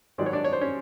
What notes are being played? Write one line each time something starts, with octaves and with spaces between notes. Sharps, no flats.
G#2 D#3 F#3 D5
C#5
D4 D5
C#5
C5
C#4 C#5